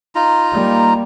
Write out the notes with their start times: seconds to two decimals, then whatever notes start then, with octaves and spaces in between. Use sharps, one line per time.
0.15 D#4 F4 A#5
0.53 G3 A#3